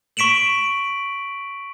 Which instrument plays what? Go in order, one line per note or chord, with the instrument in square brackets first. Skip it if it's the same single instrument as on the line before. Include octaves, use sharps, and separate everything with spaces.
[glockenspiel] C#6 B6 D7 E7 F#7